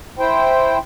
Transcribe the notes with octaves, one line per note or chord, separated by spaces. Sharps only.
E4 C5 G5